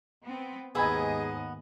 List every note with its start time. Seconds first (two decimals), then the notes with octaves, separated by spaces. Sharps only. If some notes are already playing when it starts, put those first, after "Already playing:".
0.24 B3 C4
0.75 D#2 G#2 B3 G#4 D#5 G#5 B5 E6